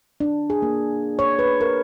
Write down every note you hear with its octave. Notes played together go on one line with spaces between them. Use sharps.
D4
G#4
A#3
C#5
B4
A#4